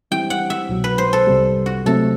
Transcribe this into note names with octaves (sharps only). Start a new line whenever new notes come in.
E3 G3 C4 E4 G4 G5
F#5
E5
C2 B2 F#3
B4
C5
A4
C2 C3 G3
F#4
C3 F#3 A3 C4 A4